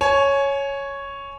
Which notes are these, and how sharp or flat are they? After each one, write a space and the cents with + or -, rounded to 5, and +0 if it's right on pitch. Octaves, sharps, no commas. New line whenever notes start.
C#5 +0 G#5 +25